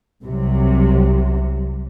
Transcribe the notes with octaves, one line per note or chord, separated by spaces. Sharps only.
C2 C3 F#3